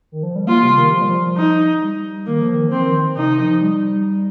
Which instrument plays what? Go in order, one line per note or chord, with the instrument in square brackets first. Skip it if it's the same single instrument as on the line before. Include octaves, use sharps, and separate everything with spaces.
[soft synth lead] D#3
F3
G3
[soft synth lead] A#3 [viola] F4
[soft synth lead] C3
D#3
F3
G3
F3
[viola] D#4
[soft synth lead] G3
[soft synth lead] D#3 [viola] A#3
[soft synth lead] F3
D#3
[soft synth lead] F3 [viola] C4
[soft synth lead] D#3
[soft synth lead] C3 [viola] D#4
[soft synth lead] F3
G3